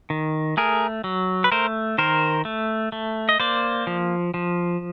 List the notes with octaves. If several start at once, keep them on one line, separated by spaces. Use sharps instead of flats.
D#3
A3 G#4 A#4
F#3
B4
A3 A#4 C5
D#3 A#4 C5
A3
A3
D#5
A#3 C5 D5
F3
F3